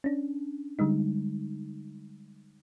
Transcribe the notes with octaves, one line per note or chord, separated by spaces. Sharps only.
C#4 D4
D3 G3 G#3 D#4